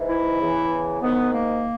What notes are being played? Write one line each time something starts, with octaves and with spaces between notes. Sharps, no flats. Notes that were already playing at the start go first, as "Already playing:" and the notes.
Already playing: G#2 E3
E4
E2 C#3 E3
G#2 D#3 B3
A#3